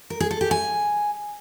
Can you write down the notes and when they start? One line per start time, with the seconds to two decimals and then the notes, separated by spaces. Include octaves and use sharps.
0.10 A#4
0.20 G#4
0.31 A4
0.41 G4
0.51 G#5